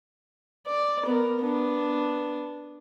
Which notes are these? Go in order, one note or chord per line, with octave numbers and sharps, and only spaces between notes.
D5
B3 A#4
B3 D4